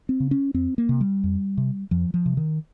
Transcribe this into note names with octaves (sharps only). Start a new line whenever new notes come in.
C4
C#3
C#4
F2 C4
A#3
C3
G3
F2
C3
F2 F3
F3
C3
D#3